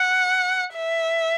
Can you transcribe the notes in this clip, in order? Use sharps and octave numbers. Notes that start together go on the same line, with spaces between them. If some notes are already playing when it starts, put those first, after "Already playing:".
Already playing: F#5
E5